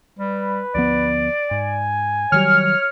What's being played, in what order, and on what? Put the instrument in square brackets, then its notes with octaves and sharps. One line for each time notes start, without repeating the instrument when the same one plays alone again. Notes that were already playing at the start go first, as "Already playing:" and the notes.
[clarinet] G3 [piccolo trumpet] B4
[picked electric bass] D2 F3 B3 [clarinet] D5
[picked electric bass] G#2 [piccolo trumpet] G#5
[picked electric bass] D#3 F#3 G3 [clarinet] C#5 [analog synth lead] F6